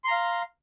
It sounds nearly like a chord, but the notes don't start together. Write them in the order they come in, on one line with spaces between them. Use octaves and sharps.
C6 A#5 F5